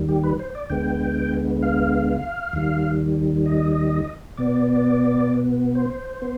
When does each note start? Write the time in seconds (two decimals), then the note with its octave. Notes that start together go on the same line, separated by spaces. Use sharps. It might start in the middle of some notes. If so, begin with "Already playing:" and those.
Already playing: D#2 D#3 G3
0.09 G4
0.23 B4
0.39 C5
0.55 D5
0.70 D2 D3 G#3 B3 G5
1.62 F5
2.53 D#2 D#3 G3
3.46 D#5
4.37 B2 B3 D5
5.75 C5
6.22 B3